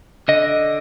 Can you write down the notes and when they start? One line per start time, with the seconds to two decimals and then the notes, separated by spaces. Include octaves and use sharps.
0.28 D3 D#5